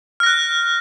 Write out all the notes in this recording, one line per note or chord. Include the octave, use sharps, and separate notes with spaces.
F6 F#6 A#6